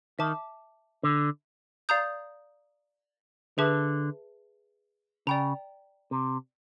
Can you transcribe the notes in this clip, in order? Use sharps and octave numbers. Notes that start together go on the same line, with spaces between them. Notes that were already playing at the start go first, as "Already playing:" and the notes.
D#3 E5 A5 D6
D3
D5 F5 A#5 D#6 G6
D3 G#4 B4 E5 A5
C#3 D5 G5 A#5
C3